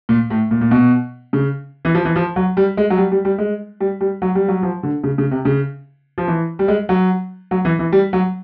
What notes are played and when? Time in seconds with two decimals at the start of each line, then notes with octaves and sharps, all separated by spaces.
0.09 A#2
0.30 A2
0.51 A#2
0.61 A#2
0.71 B2
1.33 C#3
1.85 E3
1.95 F3
2.05 E3
2.16 F3
2.36 F#3
2.57 G3
2.77 G#3
2.90 F#3
2.98 G3
3.12 G3
3.25 G3
3.38 G#3
3.80 G3
4.01 G3
4.22 F#3
4.35 G3
4.48 F#3
4.63 F3
4.83 D3
5.04 C#3
5.18 C#3
5.31 C3
5.45 C#3
6.18 F3
6.28 E3
6.59 G3
6.68 G#3
6.89 F#3
7.51 F#3
7.65 E3
7.79 E3
7.92 G3
8.13 F#3